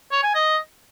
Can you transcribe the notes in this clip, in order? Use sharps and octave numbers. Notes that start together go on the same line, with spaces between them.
C#5
G#5
D#5